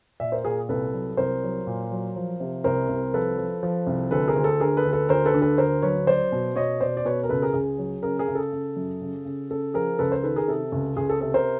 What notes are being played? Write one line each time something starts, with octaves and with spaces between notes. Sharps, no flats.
A#2 D5 E5
A#4 C5
A#2 G#4 A#4
C2 A4 B4
F#3
C2 A#4 C5
F#3
A#2
F#3
F3
C3
C2 A#4 C5
C2
F3 A4 B4
F3
F3
C2
D2 A4 B4
G#4 A#4
D2
A4
D3 G#4 A#4
A4 B4
D2
A4 B4
D2 A#4 C5
A4 B4
D3
A4 B4
D2 A#4 C5
F#3 B4 C#5
F#3 C5 D5
B2
B2 C#5 D#5
B2 C5 D5
D5
B2 B4 C#5
A#4
C#2 A4 B4
G#4 A#4
C#2 G#4
F#3
C#3 G#4 A#4
G#4 A#4
C#3
A4
C#3
F#2
C#3
C#3
C#3 A4
F3 G#4 A#4
C#2 A4 B4
A#4 C5
D#3 A4 B4
G#4 A#4
C3 A4
C#2
C#2 G#4
A4
C3 A4
A#4 C5